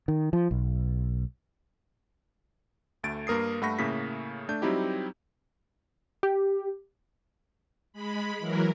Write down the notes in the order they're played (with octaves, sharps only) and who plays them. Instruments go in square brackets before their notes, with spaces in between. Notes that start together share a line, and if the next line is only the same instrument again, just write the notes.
[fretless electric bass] D#3
F3
B1
[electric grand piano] D2 A3 A6 D7
G2 A#3 A#4 D#6 C7
G2 A3 F#5 B5 C#6 A#6
A2 C#3 A3 A#3 B6
A3 D4 G6
F#3 G3 C4 D#4 E4 G4
[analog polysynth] G4
[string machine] G#3 B5
E3 F#3 A#4